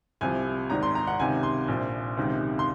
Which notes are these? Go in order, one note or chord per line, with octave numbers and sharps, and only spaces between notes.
C2 C3 F3 G#5
G#1 G#2 D#3 A#5
C6
A#5
F#5
C#2 C3 D#3 G#5
C6
A#1 A#2 F3
C#2 C3 D#3
C6